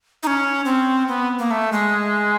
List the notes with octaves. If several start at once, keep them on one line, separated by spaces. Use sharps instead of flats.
D#4
C#4
C4
B3
A#3
A3
G#3